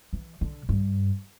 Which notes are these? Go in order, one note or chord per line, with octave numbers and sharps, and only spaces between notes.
E3
D3
G2